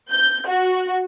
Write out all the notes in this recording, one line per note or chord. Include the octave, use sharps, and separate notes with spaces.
G6
F#4